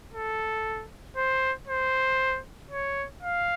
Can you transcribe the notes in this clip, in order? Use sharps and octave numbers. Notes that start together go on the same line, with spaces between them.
A4
C5
C5
C#5
F5